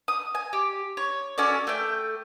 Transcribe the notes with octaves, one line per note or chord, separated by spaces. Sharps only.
D#6
G#5
G4
C#5
C#4 F#4 A4 D5
A3 G5